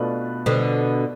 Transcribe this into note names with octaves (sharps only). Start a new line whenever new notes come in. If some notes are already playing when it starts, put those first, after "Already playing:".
Already playing: B2 A3 D4 F4 B4
B2 D3